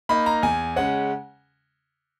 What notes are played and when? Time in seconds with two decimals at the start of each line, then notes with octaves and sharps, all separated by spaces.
0.09 A#3 D#4 B5
0.26 A#5
0.43 E2 G#5
0.76 C#3 G#3 C#4 F#5